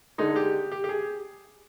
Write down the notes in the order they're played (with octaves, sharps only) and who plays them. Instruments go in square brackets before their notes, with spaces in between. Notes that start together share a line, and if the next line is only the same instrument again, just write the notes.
[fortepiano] D3 G#3 D#4
G4
G4
G4
G#4